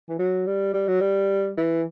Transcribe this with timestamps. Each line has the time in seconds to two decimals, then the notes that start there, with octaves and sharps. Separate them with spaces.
0.09 E3
0.19 F#3
0.47 G3
0.74 G3
0.88 F#3
1.01 G3
1.58 E3